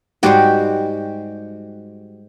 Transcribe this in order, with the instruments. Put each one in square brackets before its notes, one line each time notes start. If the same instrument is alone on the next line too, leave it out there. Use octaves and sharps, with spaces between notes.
[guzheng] G#2 G3 G#3 [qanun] F#4 G4